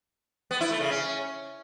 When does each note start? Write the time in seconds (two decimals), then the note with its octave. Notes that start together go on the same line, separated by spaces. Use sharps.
0.51 B3
0.61 E4
0.71 A3
0.81 C#3
0.91 C#4